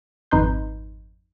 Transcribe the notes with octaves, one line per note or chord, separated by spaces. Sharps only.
G#1 F2 D#4 B4 C6 G6